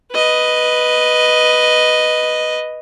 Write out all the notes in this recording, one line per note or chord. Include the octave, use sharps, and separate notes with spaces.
B4 D#5